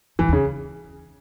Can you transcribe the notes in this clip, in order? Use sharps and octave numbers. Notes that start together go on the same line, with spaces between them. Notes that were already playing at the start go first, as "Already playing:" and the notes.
F#2 E3
E2
C#3